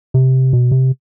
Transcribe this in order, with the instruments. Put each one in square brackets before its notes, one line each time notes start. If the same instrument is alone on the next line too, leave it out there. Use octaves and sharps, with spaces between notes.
[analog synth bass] C3
B2
C3